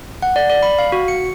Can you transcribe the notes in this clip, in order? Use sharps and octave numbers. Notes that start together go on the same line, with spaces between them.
F#5
D5
D5
B5
F5
F#4
C#7